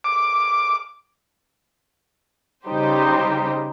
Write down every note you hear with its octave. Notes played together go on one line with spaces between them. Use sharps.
D6
C#3 G3 D#4 G4 C5